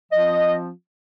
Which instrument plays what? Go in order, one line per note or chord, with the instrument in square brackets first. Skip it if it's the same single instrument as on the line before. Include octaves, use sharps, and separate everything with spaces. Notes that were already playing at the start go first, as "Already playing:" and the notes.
[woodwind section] F3 C4 F4 D#5